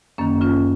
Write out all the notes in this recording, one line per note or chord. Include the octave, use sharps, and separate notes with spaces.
F#2 D#3 A#3 C#4
C#4 F4